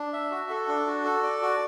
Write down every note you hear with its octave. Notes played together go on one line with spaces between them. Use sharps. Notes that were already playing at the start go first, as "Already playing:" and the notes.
Already playing: D4
E5
F#4
A4
D4
F#4
A4
D5
F#4